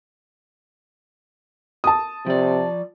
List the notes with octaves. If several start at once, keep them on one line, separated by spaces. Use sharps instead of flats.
A5 D#6
C3 F3 D5